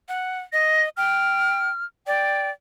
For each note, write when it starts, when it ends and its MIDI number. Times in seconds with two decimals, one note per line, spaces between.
0.09 0.40 78
0.53 0.89 75
0.53 0.83 94
0.97 1.69 79
0.97 1.85 89
2.07 2.51 74
2.07 2.49 79